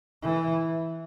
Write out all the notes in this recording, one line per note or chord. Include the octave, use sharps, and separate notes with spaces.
E3